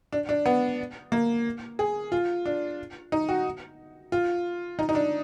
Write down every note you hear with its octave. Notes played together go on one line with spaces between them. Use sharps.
D4
D4
B3
A#3
G#4
F4
D4
D#4
F#4
F4
D#4
D#4
D4